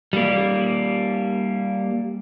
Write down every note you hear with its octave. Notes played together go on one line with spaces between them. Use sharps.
G3 A#3